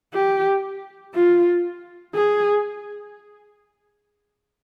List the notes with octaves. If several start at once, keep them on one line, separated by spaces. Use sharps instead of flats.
G4
F4
G#4